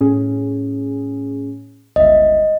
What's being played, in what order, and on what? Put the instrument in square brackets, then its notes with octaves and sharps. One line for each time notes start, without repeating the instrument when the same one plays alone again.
[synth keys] A2 C#4 G#4
[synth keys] G1 C#2 E5 [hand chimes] D#5